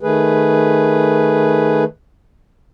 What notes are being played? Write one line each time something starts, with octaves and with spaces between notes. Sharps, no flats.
D#3 A3 G#4 B4